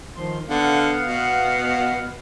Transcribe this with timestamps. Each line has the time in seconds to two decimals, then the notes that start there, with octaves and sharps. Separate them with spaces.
0.16 D#3 F3 C6
0.49 D3 B3 F5 F#5
1.05 B2